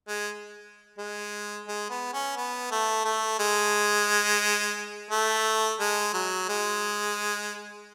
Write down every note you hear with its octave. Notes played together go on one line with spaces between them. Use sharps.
G#3
G#3
G#3
B3
C#4
B3
A3
A3
G#3
A3
G#3
F#3
G#3